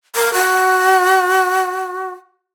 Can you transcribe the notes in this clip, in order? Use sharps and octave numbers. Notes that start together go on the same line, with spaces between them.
A#4
F#4